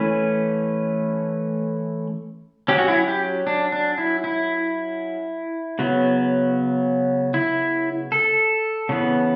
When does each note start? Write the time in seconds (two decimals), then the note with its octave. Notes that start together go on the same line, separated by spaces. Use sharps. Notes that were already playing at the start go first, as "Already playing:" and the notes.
Already playing: E3 A3 C#4 B4
2.68 F#3 C#4 G4
2.78 F#4
2.88 E4
3.08 G4
3.47 D4
3.72 D4
3.98 E4
4.24 E4
5.79 C#3 F#3 B3
7.34 E4
8.12 A4
8.89 C#3 E3 B3